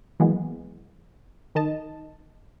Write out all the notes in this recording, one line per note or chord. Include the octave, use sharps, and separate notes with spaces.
E3 F#3 G#3 A#3 B3
D#3 D#4 D#5 A5